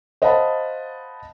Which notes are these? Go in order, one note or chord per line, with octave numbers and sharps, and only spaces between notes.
C5 D#5 F5 F#5 A5 B5